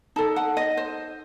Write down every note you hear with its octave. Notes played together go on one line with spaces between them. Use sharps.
D#4 A4 A5
F#5
D#5
C5